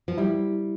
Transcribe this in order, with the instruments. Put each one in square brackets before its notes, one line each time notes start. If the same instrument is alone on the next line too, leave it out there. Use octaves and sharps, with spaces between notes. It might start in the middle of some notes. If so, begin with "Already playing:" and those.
[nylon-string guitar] F3
[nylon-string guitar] G3 [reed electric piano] E4